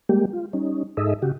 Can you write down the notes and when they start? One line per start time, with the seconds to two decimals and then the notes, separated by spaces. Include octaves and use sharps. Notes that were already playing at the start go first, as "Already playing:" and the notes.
0.09 G3 G#3 A#3 G4
0.33 F4
0.53 G3 C#4 D#4
0.97 G#2 D#4 G#4 A4 D#5 E5
1.22 C#3 F#4 G4